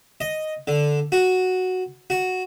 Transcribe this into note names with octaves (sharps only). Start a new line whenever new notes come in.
D#5
D3
F#4
F#4